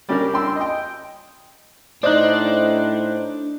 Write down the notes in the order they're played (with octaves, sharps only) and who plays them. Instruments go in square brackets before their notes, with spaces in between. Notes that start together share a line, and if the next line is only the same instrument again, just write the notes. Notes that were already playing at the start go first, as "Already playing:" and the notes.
[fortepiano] G3 C#4 D4 G4 A#4
G5 C6 E6
D#5 G5
[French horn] A2 [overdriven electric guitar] D4 [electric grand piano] D#4 C5 [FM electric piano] D5 D#5 F#6